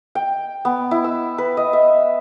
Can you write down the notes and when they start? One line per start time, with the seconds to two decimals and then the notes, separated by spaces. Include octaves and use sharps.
0.15 G5
0.65 B3
0.91 E4
1.04 E6
1.38 B4
1.57 D#5
1.73 E5